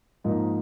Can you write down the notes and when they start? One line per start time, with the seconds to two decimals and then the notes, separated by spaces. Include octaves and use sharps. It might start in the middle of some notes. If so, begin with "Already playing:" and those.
0.24 G#2 F3 A#3 D#4